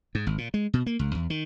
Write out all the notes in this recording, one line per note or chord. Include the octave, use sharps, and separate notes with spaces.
G#2
G#1
A#2
G#3
B2
A#3
C#2
E2
D#3